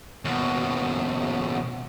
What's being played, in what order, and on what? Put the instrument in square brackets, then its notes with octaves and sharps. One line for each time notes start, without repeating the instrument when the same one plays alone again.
[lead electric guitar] D#2 B2